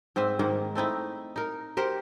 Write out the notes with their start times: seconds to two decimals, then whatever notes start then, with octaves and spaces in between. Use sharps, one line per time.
0.16 G#2 C4 B4 E5
0.39 G#2 D#3 A#3 F#5
0.75 A3 C4 D#4 E4
1.36 D#4 A#4
1.77 G4 A#4 C5 F#5